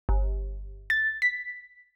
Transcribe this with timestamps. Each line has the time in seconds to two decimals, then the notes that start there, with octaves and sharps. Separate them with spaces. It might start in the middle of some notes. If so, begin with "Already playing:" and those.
0.09 G1
0.90 A6
1.22 B6